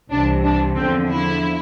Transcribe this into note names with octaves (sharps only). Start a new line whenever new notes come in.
C2 C3 E3 D4
D4
E2 D3 F3 C4
E4